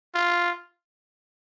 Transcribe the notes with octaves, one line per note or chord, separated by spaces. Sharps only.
F4